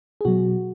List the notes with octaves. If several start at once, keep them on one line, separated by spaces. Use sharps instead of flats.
G#4
B2 F#3 F#4